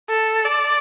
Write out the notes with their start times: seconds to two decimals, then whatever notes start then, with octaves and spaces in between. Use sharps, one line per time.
0.10 A4
0.45 D5